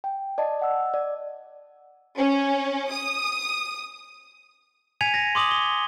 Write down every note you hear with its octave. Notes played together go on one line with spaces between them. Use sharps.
G5
D5 D#5 A5
D#5 F#5 E6
D5
C#4
D#6
G#5 G#6 B6 C#7 D#7 F7
G#6 A#6
C6 D6 D#6 G#6 F#7
G7